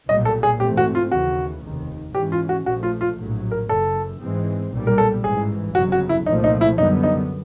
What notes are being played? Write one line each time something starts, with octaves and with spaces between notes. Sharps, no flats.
B1 A#2 G3 D#5
A4
G#4
G#2 E3 A3 C4 G4
F#4
F4
D#2 C#3 E3 F#4
F1 D#2 D#3
G#2 E3 G#3 C#4 G4
F4
F#4
A#1 A#2 F3 A3 F#4
F4
F4
A#1 A2 F#3
A#4
F#1 F#2 C#3 A4
G#2 E3 G#3 C4
B1 A#2 G3
A#4
A4
A1 G#2 E3 G#4
G1 F2 C#3 F#3 F#4
F#4
E4
C2 A#2 F3 A3 D#4
D#4
E4
F#2 D3 G3 B3 D#4
D#4